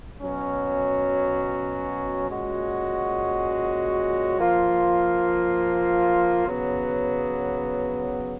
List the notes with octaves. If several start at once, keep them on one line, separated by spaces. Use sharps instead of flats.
B2 F#3 C#4
A#2 G#3 C#4 F#4
F3 A#3 F4
C#3 F#3 B3